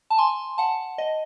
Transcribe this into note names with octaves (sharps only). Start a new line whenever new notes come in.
A5
G#5 C6
F#5 A5
D#5